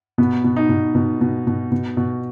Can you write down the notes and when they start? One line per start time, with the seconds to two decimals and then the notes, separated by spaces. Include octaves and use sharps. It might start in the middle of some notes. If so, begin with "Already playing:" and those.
0.18 B2 B3
0.44 B2
0.56 D#4
0.69 B2
0.95 B2
1.21 B2
1.47 B2
1.72 B2
1.97 B2